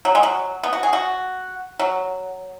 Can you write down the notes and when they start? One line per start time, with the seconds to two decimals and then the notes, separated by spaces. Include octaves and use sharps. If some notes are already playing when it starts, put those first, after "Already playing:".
0.05 F#3
0.15 G#3
0.23 F#3
0.63 B3
0.73 F#4
0.83 G#4
0.93 F#4
1.79 F#3